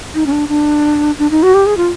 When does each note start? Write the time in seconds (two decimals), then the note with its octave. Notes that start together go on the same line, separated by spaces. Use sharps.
0.15 D#4
0.26 C#4
0.32 D4
0.49 D4
1.19 D4
1.31 D#4
1.43 F#4
1.54 G4
1.66 G#4
1.77 F4